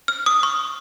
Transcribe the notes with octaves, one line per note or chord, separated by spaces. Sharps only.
F6
D#6
C#6